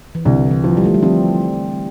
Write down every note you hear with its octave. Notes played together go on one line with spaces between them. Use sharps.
E3
C2 D3
E3
F3
G3
A3
G3
F3 C4